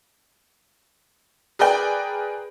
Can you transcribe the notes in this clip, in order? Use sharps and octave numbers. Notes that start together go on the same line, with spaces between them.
G#4 A#4 B4 D5 G5